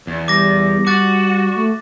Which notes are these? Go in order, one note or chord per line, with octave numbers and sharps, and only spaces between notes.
E2
G3 D6 A#6
F#4 D6 F#6 A6
A3